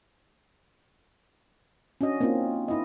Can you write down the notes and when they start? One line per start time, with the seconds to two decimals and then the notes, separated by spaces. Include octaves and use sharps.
2.01 C#4 D4 F#4 D#5
2.20 A#3 C4 C#4 D#4 F4
2.68 D#4 E4 D#5